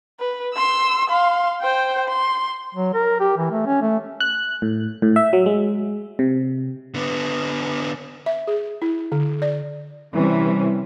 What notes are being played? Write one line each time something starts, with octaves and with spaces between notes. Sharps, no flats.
B4
C6 E6
F5 C6
C5 G5
C6
F#3
A#4
G4
E3
A3
C#4
A3
F#6
A2
A2
E5
F#3
G#3
C3
D3 B3
E5
G#4
E4
D3
D5
C3 E3 G3 C#4